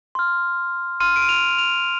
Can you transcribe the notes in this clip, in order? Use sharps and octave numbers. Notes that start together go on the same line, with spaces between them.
C6 F6
C6 F6 D#7
D7
D#7
F7
F7